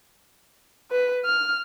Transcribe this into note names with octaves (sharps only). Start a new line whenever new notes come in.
B4
F6